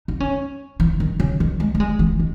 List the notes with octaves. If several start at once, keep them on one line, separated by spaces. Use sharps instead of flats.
D#4
C#4
E3
D#3
C#3
D#3
G#3
A3
G#3
E3
D#3